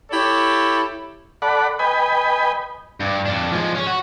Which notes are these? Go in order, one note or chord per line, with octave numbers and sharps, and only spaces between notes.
E4 G4 A4 C#5
A4 D5 F#5 B5
B4 D#5 G5 G#5 B5
G2
F2 D4
F3 G#3
C#4
F#4